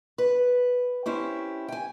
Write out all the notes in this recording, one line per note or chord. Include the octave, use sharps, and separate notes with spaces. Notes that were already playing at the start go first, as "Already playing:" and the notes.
B4
C4 C#4 E4 G4
G5 G#5